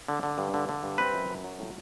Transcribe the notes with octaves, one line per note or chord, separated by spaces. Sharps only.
D3
D3
G2
D3
D3
G2
C4 B4
F#2
F#2
F#3
A2